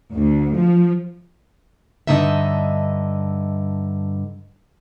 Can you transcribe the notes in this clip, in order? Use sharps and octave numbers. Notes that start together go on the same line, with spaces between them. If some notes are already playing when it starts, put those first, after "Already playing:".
D2
F3
G2 D3 A3 D#4 D#5 E5